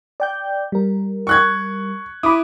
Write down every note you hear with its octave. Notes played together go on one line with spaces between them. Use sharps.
D5 G5 G6
G3 A#4
C#6 F#6 G#6
E4 B5 D6 D#6